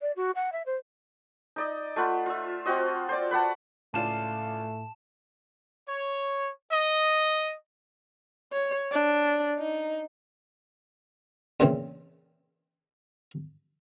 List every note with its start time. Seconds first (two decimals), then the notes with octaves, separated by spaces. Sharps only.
0.01 D5
0.16 F#4
0.35 F#5
0.52 E5
0.66 C5
1.56 D#4 D5 D#5
1.96 A3 F4 F#5 B5
2.26 F4 E5
2.66 C4 F4 F#4 D#5
3.09 C5 D5 D6
3.31 B4 D5 F#5 A5
3.94 C#2 A2 A3 F4 D5 A5 E7
5.89 C#5
6.72 D#5
8.53 C#5
8.92 D4
9.59 D#4
11.60 E2 A#2 C#3 E3 C4